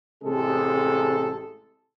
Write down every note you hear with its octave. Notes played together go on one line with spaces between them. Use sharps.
A1 C3 G#3 G#4 A4